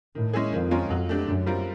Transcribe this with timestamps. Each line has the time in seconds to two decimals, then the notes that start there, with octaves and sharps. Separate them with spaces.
0.15 A2 D#3
0.33 G#3 C#4 E4 G#4
0.53 F2 D#3
0.71 G#3 C#4 F4 A#4
0.90 F2 F#3
1.09 A3 D4 G4
1.27 F#2 D3
1.46 G3 C4 F4 A#4